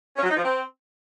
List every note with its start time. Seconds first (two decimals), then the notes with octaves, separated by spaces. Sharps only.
0.16 C#4
0.22 F#3
0.29 D#4
0.36 F3
0.42 C4